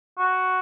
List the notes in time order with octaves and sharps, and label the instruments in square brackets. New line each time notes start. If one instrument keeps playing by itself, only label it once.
[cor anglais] F#4